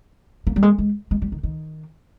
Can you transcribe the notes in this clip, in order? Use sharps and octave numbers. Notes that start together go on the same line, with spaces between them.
A#3
G3
G#3
G#3
G#3
G3
D#3
D#3